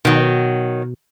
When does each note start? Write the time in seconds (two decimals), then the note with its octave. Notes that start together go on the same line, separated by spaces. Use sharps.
0.05 B2 D#3 F#3